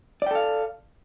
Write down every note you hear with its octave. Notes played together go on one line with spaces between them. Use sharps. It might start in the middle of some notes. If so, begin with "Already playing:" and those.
A4 D5 F5 G5